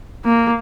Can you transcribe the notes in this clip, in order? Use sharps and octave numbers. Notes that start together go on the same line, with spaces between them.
A#3